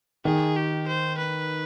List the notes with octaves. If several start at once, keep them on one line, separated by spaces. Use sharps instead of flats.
D#3 G#4
G4
C5
B4